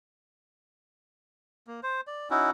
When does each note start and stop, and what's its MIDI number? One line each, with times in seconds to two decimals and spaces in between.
1.67 1.80 58
1.83 2.01 72
2.07 2.29 74
2.30 2.51 61
2.30 2.51 63
2.30 2.51 64
2.30 2.51 66